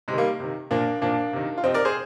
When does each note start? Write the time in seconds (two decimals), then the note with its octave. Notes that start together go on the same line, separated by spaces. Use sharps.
0.08 C3 G#3
0.13 D#3
0.18 G3 A#3
0.40 C3 D#3
0.71 A#2 F3 A#3 D4
1.02 A#2 F3 A#3 D4
1.33 C3 D#3
1.58 F4
1.64 C3 F3 C4 D#4
1.74 A#4 D5
1.85 G#4 C5